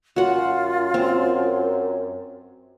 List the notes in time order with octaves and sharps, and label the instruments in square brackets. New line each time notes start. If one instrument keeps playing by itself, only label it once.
[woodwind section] F#2 [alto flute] F4 [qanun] F#4 F#5
[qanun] C4